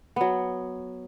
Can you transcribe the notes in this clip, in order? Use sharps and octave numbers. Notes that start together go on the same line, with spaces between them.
F#3 B3